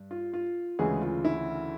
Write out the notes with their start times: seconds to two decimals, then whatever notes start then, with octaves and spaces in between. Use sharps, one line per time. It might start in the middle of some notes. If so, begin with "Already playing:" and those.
Already playing: G2
0.11 F4
0.33 F4
0.79 D2 C#3 E3 G#3 G#4
1.01 F4
1.25 E4